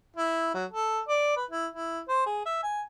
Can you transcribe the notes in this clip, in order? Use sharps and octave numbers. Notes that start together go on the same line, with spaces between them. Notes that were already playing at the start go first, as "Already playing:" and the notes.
E4
F#3
A4
D5
B4
E4
E4
C5
G#4
E5
G#5